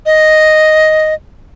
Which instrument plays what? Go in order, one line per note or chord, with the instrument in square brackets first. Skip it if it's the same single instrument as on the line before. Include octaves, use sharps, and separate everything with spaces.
[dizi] D#5